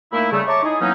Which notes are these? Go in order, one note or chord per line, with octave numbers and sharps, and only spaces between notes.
A#2 A3 A#3 D#4 E4
C#3 G3 A3
C#5 E5 A5 A#5 C#6 D6
D#4 E4 G#4
E3 F#3 A#3 B3 C#4 D#4